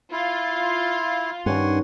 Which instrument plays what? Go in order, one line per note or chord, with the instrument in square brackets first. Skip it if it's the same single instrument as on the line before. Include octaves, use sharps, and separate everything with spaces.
[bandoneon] E4 [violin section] F4
[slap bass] G2 [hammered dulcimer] D#3 C#4 [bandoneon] F#5 G#5 C6